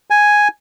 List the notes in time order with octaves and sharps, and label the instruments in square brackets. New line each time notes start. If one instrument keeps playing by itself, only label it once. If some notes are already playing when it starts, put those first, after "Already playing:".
[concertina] G#5